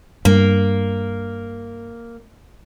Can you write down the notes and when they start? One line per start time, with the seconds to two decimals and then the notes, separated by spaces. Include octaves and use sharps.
0.25 G2 A#3